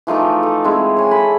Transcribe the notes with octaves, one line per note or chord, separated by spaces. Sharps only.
E3 F3 A3 D#4
A4
G#3 C4 E4
C#5 G#5
A4 B5